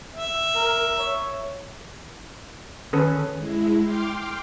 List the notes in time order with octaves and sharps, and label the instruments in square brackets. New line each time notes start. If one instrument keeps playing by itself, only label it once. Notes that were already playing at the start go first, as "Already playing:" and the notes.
[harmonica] E5
[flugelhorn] A#4
C#5
[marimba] D#3 [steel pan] C#4 A4 B4
[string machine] G#3 E4
G5 C6 D6 F6